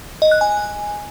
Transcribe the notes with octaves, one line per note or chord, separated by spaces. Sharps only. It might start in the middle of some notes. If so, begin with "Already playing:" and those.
D#5
F#6
G#5